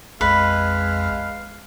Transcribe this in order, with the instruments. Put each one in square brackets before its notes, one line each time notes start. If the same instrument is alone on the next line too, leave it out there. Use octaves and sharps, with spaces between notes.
[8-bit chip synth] A#1 F2 [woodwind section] G#3 [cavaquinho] B4 [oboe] F5